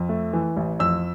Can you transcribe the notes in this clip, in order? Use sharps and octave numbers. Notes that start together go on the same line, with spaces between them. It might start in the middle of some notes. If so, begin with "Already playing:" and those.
Already playing: F2
A3
E3
A1
F2 E6